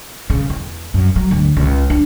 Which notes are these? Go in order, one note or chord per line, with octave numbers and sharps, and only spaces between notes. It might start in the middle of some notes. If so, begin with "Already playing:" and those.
C#3
E2
F#2
F#3
D2
C#2
D4